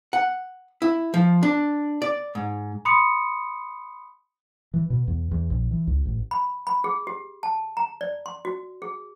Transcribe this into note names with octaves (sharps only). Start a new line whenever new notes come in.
F#5
E4
F3
D4
D5
G#2
B5 C6 D#6 C#7
E3
B2
E2
E2
A#1
E3
C#2
A1
B5
B5
G#4
G4
A5
A#5
D5
C6
F#4
G#4